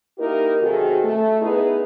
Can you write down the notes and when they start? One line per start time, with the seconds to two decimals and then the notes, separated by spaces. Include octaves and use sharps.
0.18 A#3 D#4 E4 G4 A#4
0.60 F#2 C3 D#3 F#4 G#4 A4
1.04 A3
1.42 B3 D#4 E4 G#4 B4